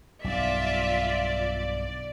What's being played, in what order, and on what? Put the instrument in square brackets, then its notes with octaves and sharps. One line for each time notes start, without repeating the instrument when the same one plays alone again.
[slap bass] B1 G2 [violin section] F4 E5 [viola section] D5